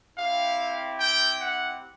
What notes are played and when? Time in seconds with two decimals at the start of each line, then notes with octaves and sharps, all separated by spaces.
0.18 C4 E4 G4 F5
1.00 G5
1.41 F#5